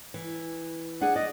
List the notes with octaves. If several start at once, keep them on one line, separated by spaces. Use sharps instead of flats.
E3
D4 G#4 F#5
D5 D#5